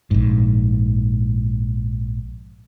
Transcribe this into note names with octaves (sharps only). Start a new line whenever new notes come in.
A#1 G#2